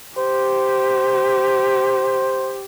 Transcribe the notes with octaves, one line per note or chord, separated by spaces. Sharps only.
G4 C5